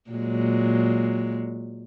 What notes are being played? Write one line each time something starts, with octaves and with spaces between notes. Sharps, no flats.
A#2 F#3 G#3